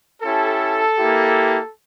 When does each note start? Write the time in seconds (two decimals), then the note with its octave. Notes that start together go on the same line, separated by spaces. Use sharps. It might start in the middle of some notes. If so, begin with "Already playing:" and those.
0.23 C#4 E4 G4 A4
0.98 A#3 E4 G4